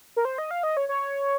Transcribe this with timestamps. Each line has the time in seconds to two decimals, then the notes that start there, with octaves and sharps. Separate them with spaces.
0.17 A#4
0.25 C5
0.38 D#5
0.51 F5
0.63 D#5
0.77 C#5
0.89 C#5